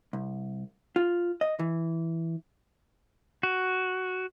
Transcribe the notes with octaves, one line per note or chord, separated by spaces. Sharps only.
C2
F4
D#5
E3
F#4